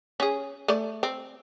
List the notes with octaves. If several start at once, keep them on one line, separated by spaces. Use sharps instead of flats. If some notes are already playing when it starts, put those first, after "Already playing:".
C#4 G#4
A3 D5
C4